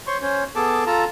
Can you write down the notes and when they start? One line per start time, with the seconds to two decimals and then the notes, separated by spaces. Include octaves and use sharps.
0.07 C5 C#5 C6 C#6
0.22 C#4 C5 C#5
0.56 B3 G#4 A4 A5 D6
0.86 F4 A4 A5 A#5